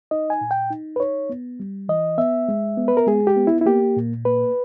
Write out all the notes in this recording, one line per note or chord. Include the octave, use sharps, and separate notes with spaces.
D#4 D#5
G#5
A#2
G5
D#4
B4
D#4 C#5
B3
G3
E3 D#5
B3 E5
G#3
B3
B4
A#4
G#3 G#4
G4
B3
E4
E4
A#3 G4
A#2
A#3 B4